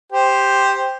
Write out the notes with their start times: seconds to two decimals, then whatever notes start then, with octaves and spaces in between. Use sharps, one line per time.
0.12 G4 C5